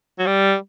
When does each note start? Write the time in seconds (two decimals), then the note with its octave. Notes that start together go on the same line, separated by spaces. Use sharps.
0.19 F#3
0.26 G3